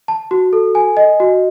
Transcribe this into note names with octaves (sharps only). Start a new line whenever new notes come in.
A5
F#4
A4
G#5
D#5
F#4